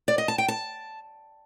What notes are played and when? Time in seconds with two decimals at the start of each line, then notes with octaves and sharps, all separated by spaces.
0.08 D5
0.18 D#5
0.28 A5
0.38 G5
0.48 A5